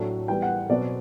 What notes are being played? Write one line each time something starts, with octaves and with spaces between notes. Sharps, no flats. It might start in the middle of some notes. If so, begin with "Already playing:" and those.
Already playing: A2 F#3 A3 D4
E3 G3 B3 G5
F#5
B2 F#3 C4 D5